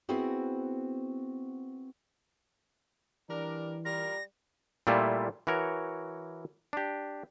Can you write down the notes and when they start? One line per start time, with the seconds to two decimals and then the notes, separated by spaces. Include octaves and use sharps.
0.09 B3 C4 E4 F#4 G#4 C5
3.30 E3 G3 D4 A#4
3.85 G3 F4 A#4 A#6
4.87 A#2 G3 A3 E4 F4
5.47 E3 F#4 A#4 C#5
6.73 D4 G4